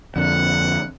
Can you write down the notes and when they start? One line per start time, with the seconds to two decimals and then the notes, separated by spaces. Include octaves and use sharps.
0.16 F2 D3 F#5